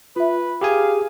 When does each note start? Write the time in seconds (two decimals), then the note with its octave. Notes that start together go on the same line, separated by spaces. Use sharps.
0.16 F4 B4 E5
0.61 G4 G#4 F5 G#5